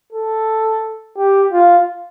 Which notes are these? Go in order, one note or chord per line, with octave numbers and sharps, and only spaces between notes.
A4
G4
F4